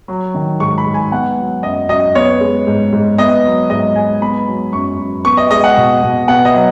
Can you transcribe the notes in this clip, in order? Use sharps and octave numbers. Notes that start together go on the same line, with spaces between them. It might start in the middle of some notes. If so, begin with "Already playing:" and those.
F#3
D#3
G#2 C#6
B5
G#2
G#5
B3 F#5
F#3
F#2 D#5
F#2 D#5
B3 C#5
G#3
G#2
G#2
B3 D#5
F#3
G#2 D#5
G#2 G#5
B3 B5
F#3
F#2 C#6
F#2
B3 C#6
D#5
G#3 D#5
F#5
B2
B2
B3 F#5
D#5
F#3